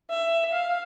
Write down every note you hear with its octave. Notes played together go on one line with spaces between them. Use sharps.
E5
F5